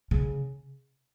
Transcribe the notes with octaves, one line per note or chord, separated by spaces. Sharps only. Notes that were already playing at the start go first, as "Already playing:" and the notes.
C#3